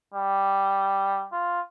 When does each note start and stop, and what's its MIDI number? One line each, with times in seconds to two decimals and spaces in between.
0.15 1.27 55
1.32 1.61 65